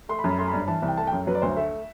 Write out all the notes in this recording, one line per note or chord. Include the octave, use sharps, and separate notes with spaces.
A3 C6
B5
F#2
B5
A3 C6
B5
G2
E3 A5
C2
G5
A3 A5
F#2 G5
F#3 B4
D5
D2 C5
A3 E5